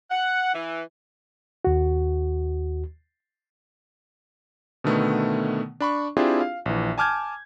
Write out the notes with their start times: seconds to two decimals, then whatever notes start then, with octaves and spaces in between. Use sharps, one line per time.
0.11 F#5
0.54 E3
1.65 D#2 F#4
4.84 B2 D3 D#3 A3 B3
5.80 D4 B5 C#6
6.17 C4 D4 E4 F4 G4 G#4
6.41 F5
6.66 A#1 E3
6.98 G#5 A5 D6 F6 G6 G#6